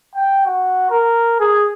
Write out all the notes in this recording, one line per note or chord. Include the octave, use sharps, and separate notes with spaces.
G5
F#4
A#4
G#4